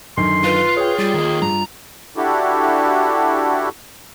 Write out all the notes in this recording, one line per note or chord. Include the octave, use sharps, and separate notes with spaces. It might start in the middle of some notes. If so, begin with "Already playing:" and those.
F#2 D3 D#3 C6
F4 B4
G#4 C#5 G5
G3 F4
D#3 A#3
G2 A#5
D4 E4 F#4 G4 A4